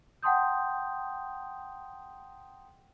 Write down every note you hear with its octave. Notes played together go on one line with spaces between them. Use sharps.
F#5 G5 A5 C6 D#6 G6